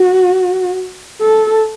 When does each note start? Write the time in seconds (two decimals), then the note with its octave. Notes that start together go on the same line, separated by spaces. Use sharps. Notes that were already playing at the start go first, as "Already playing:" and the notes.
Already playing: F#4
1.21 A4